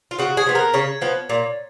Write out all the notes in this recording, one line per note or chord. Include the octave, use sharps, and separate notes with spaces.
F4
C#3 F#4
G#4
F3 B3
A#4
C#3 C#5
F3 B3
A#2